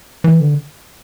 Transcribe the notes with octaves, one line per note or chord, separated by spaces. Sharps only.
E3
D3